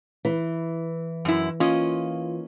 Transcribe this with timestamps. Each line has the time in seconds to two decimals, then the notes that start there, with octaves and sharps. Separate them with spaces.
0.25 E3
1.25 F#2 E4
1.60 A#3 C#4 F4 D#5